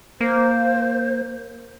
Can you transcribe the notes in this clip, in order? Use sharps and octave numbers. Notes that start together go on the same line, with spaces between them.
A#3 C5